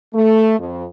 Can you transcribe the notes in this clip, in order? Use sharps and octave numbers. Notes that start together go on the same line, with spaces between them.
A3
F2